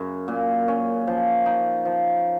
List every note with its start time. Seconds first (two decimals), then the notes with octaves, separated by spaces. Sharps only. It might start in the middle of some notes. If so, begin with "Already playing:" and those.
Already playing: F#2 C#3
0.28 A#2
0.68 C#4
1.07 F3
1.46 D#4
1.85 F3